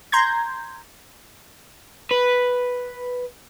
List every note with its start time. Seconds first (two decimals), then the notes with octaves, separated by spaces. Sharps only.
0.12 A#5 C6 G6 G#6
2.11 B4